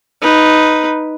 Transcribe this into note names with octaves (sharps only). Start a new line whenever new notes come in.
D#4 B4